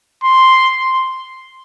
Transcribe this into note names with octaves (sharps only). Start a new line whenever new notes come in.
C6